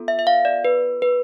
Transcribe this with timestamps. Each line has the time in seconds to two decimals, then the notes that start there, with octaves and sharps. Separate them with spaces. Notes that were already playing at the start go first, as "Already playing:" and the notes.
Already playing: B3 F4 A4
0.08 E5
0.19 E5
0.27 F5
0.45 D5
0.65 B4
1.02 B4